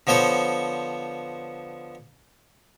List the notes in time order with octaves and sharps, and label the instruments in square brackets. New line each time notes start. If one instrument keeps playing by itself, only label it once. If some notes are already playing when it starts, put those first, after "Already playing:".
[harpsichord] D3 F3 B3 C5 C#5